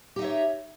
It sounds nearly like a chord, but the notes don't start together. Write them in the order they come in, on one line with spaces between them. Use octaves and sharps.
G4 D#4 E5 C#5